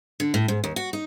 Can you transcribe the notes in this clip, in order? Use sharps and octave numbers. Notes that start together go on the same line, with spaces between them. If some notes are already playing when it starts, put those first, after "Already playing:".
D3
A2
G#2
D#2
F#4
D#4